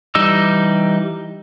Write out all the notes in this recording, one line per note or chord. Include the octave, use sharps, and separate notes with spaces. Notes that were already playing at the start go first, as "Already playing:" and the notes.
E3 G3 D#4 E6